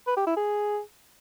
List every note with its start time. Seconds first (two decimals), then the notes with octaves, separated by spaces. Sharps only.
0.07 B4
0.17 G4
0.27 E4
0.36 G#4